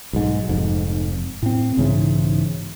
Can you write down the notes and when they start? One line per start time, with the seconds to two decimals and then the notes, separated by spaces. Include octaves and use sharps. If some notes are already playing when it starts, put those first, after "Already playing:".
0.13 B1 G#2
0.49 F1 F2 G#2
1.42 A2 C4
1.77 B1 G#2 C#3 E3